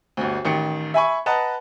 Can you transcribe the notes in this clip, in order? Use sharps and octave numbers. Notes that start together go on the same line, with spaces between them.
G1 D2
A1 D#3 G5 C#7
E5 G#5 B5 C#6
B4 D#5 F#5 A5 A#5